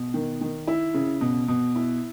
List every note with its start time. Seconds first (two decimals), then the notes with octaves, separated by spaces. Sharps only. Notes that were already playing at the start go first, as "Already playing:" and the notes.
Already playing: B2
0.14 D#3
0.41 D#3
0.67 E4
0.94 C#3
1.21 B2
1.48 B2
1.75 E4